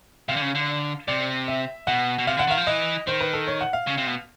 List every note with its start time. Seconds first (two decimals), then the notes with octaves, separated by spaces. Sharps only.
0.28 C3 F5
0.37 D3
0.42 C#3
0.55 D3
1.08 C3 D5
1.48 E5
1.87 B2 F#5
2.19 B2
2.27 C3 F5
2.37 D3 F#5
2.48 D#3 F5
2.57 F3
2.67 E3 D#5
3.07 D#3 C5
3.21 B4
3.33 A4
3.47 C#5
3.61 F#5
3.73 F5
3.87 C#3
3.98 C3
4.07 B2